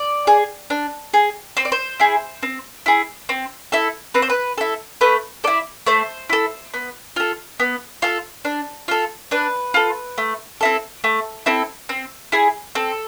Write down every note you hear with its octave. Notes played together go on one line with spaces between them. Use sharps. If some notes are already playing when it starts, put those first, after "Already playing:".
Already playing: D5
G#4
D4
G#4
C4 C5
D5
C5
E4 G#4
C4
E4 G#4
C4
E4 A4
C4 B4
C5
B4
E4 A4
A3 B4
E4 A4 D5
A3 C5
E4 A4
B3
F4 A4
B3
F4 A4
D4
F4 A4
D4 B4
F4 A4
A3
C4 E4 A4
A3
C4 E4 A4
C4
E4 G#4
C4 A4